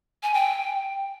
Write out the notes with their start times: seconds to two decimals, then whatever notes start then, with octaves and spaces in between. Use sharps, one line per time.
0.23 G#5
0.34 G5